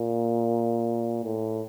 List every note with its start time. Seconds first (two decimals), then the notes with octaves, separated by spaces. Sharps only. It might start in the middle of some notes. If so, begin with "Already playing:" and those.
Already playing: A#2
1.24 A2